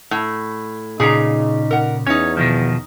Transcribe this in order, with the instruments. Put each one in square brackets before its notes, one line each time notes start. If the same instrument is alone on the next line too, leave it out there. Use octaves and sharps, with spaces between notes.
[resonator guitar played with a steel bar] A2
[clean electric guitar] A#2 C#3 [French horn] D#4 [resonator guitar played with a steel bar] G#4 G#5 A#5
[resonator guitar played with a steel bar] A#4 F#5
[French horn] E2 [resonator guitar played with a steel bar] C#4 D#4 [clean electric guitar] C#5
[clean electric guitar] B2 D#3 F3